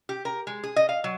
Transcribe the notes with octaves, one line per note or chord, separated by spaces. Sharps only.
G4
A#4
G#3
G#4
D#5
F5
F#3